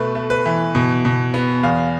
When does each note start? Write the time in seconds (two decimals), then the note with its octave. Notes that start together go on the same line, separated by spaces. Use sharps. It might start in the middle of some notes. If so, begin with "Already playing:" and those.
Already playing: B2 A3 B4
0.15 A3
0.30 B4
0.45 E3
0.75 B2
1.05 B2
1.34 B3
1.63 E2 F5